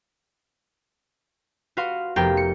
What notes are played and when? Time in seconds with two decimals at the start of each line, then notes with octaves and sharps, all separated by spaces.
1.77 F#4 B4 F5 C6
2.16 F1 B3 G4 A#4 G5 C6
2.37 C#7